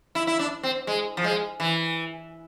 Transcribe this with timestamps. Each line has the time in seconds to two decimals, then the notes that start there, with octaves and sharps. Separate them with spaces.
0.15 E4
0.27 E4
0.39 D4
0.63 C4
0.87 G#3
1.17 F3
1.24 G#3
1.60 E3